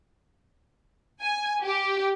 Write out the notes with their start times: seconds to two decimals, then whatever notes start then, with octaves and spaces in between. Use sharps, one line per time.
1.21 G#5
1.63 G4